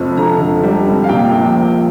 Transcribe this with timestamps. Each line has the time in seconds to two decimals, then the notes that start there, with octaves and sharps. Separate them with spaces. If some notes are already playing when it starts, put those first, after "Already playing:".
Already playing: F1 F2
0.17 D3 A#5
0.40 D3
0.63 G3
0.87 F1
1.04 F5
1.09 A#2 G5
1.33 A#1
1.55 C4